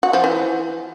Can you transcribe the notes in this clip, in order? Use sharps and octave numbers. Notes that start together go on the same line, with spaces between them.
F#4
F3
E3